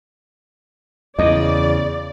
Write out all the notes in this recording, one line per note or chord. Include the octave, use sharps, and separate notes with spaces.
E2 C#3 D5 D#5